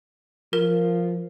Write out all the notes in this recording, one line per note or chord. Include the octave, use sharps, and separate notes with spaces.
F3 A#4